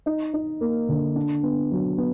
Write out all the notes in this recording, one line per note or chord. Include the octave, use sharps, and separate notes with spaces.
D#4
D#4
A#3
D3
D4
B3
F#3
B3